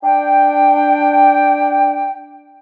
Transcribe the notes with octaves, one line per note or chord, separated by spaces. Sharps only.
D4 G5